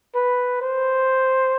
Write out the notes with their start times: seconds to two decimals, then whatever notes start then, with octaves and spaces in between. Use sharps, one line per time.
0.15 B4
0.62 C5